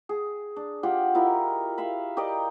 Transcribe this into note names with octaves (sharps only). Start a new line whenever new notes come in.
G#4
D4
F4 G4 F#5
E4 F4 A#4 D#5
E5 F5 B5
G4 A#4 D5 D#5